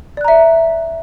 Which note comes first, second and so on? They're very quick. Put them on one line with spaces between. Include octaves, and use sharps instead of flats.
D5 F#6 A#5 E5